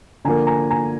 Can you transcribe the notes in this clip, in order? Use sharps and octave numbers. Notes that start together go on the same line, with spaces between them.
D3 F3 A#3 G#5 A#5
G#5 A#5
G#5 A#5